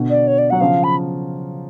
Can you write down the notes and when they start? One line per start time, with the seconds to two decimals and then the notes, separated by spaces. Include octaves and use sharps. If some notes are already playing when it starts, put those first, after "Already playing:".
Already playing: B2 D3
0.10 D5
0.27 C#5
0.38 D5
0.50 F#3 F#5
0.60 C#3 F3 F5
0.84 B5